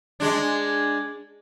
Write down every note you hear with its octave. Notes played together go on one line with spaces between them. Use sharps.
G#3 D4